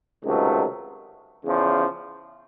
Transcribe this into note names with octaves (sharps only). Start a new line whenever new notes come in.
C#2 C3 D#3 F#3 A3
E2 C#3 F3